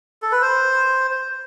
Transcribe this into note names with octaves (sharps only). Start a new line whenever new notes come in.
A4
B4
C5
C5